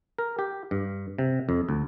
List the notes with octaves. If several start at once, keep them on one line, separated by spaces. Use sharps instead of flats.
A#4
G4
G2
C3
F2
D2